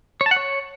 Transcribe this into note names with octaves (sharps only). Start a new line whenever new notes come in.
C#5
A5
F#5
C#5